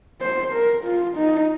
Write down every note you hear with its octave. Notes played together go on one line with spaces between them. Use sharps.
C5
A#4
F4
D#4